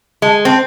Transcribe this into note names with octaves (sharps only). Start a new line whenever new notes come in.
G#3
C4